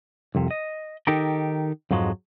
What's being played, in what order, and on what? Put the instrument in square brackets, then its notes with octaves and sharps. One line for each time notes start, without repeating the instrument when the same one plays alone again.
[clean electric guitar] C2 F2 C3
D#5
D#3 D#4 G4 A4 A#4
F2 G#2 F3 F#3 G#3